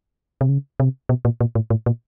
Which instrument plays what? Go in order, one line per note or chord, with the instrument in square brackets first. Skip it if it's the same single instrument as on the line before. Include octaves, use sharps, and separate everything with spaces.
[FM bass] C3
C#3
C3
B2
A#2
A#2
A2
A2
A#2